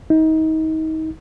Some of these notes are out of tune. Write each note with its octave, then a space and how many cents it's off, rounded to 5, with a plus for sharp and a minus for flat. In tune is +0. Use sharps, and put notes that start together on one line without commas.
D#4 +30